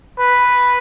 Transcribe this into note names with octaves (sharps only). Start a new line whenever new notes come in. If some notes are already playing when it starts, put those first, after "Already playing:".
B4